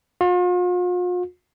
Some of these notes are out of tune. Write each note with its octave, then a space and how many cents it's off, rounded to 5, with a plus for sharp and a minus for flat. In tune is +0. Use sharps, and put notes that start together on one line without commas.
F4 +45